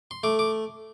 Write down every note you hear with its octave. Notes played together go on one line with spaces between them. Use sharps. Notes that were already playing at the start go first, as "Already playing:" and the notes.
C6
A3 D6
D6